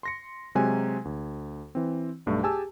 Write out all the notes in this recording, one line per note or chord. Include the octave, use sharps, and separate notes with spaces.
C6 A#6 C#7
C3 F#3 G#3 F#4 G#5 G#6
D2
E3 C4
B1 G2 A3
G4 G#4 G#5 A5 E6